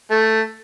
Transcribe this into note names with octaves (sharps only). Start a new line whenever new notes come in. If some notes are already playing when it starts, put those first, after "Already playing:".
A3